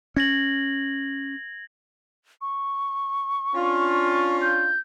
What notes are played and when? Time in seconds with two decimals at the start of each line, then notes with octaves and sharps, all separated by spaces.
0.17 C#4 G#6 A#6 F#7
2.41 C#6
3.54 C#4 D4 F4
4.41 G6